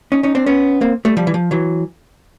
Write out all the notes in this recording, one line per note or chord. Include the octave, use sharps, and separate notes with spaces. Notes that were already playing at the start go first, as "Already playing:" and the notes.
C#4 D#4
C#4 D#4
C4 D4
B3 C#4
A#3 C4
G3 A3
F3 G3
E3
F3
E3 F#3